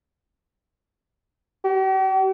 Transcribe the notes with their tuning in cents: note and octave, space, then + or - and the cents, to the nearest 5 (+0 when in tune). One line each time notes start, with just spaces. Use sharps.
G4 -45